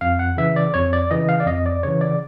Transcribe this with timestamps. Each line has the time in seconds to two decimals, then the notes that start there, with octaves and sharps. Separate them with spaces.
0.01 F2 F5
0.19 F#5
0.37 C#3 E3 E5
0.56 D5
0.74 F2 C#5
0.93 D5
1.11 C#3 E3 D#5
1.29 F5
1.40 D5
1.46 F2 D#5
1.66 D5
1.83 C#3 E3 C#5
2.01 D5